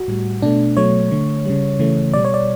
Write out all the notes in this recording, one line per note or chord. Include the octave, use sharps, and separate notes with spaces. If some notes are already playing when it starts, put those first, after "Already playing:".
Already playing: F#4
A2 G3
B2 A3 D4
B2 F#3 A3 C#5
D3 A3
C#3 G3
C#3 E3 A3
B2 G3 D5
C#5
D5